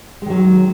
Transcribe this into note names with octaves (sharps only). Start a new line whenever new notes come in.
D#3 F#3 G#3